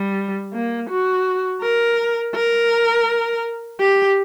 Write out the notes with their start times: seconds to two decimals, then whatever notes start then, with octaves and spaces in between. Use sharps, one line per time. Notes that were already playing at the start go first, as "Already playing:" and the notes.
Already playing: G3
0.53 A#3
0.90 F#4
1.62 A#4
2.35 A#4
3.80 G4